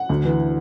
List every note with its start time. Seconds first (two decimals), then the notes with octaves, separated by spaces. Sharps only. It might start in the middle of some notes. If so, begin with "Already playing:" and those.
Already playing: F#5
0.09 D2
0.25 E3